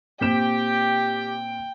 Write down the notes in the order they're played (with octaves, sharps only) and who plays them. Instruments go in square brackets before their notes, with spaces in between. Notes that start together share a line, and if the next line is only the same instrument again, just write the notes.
[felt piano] A#2 C4 E7 [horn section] G4 [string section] G5